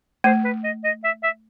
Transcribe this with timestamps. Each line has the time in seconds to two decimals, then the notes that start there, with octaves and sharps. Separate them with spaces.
0.24 A3 C5
0.44 B4
0.64 D#5
0.84 D#5
1.04 E5
1.23 E5